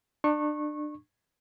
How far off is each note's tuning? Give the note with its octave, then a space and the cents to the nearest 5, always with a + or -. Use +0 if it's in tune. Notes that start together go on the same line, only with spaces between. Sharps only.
D4 +30 C#6 -20